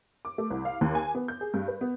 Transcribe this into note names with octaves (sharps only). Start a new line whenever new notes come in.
D6
A3
C2
F5
D#2
G#5
B3
G6
G#4
G2
B4
B3